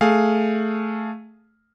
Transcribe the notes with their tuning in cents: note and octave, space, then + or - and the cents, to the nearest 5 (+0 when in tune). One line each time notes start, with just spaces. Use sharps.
A3 +0 G#4 +0 F5 +5